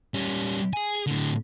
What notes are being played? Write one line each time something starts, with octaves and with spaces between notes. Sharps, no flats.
G3 C#4
G#4 G#5
A2 D3